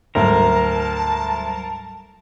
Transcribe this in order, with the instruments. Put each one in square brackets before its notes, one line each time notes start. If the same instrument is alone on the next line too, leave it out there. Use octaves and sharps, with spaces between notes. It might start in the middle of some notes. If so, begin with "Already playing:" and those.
[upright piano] D2 [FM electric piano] G#2 F#3 G3 [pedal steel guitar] A#4 [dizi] A5